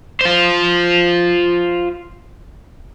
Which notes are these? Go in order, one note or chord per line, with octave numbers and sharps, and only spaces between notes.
F4 C5